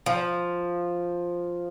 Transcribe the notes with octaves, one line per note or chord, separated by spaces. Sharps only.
F3